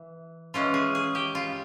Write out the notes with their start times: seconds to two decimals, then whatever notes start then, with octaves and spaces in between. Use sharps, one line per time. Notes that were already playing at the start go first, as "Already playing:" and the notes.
Already playing: E3
0.54 E3 G#3 C#4 F4
0.74 G#4
0.95 G#4
1.15 G4
1.35 F4